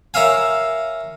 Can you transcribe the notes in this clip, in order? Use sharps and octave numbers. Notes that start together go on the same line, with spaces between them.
A#4 C#5 E5 F5 G#5